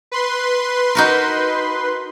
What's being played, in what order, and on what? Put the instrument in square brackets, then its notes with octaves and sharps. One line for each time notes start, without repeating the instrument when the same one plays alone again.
[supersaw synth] B4 C6
[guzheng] D#4 F#4 A#4